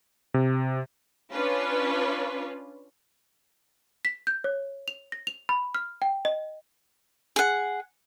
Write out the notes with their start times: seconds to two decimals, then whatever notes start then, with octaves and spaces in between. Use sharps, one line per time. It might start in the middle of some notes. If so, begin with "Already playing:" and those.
0.34 C3
1.32 C#4 D4 F4 B4
4.05 B6
4.27 G6
4.44 C#5
4.88 F7
5.12 A#6
5.27 F7
5.49 B5
5.75 F6
6.02 G5
6.25 D#5
7.36 G#4 F#5